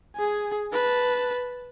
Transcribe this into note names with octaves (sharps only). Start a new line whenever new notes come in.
G#4 G#5
B4 A5